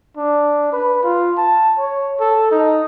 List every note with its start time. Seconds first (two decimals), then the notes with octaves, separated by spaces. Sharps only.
0.17 D4
0.72 B4
1.04 F4
1.37 A5
1.78 C#5
2.20 A4
2.51 D#4